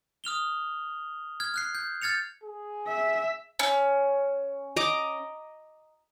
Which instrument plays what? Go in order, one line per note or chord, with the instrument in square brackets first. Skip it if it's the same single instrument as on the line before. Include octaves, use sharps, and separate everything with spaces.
[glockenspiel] D#6 F6 F7 G7
F6 G#6
F6 F#6 C7
G6
F6 G#6 A6 C#7 F7
[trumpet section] G#4
[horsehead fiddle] E5
[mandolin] C#4
[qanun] D#5 A#5 D6